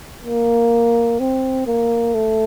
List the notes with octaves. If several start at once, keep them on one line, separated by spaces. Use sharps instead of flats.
A#3
C4
A#3
A3